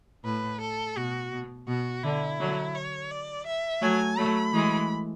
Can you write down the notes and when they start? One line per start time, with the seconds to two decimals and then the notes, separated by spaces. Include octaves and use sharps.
0.24 A2 B4
0.61 A4
0.97 B2 F#4
1.33 B2
1.68 B2 F#4
2.03 D3 E4
2.40 D3 F#3
2.75 C#5
3.11 D5
3.47 E5
3.82 F#3 A3 G#5
4.18 F#3 A3 B5
4.53 E3 G#3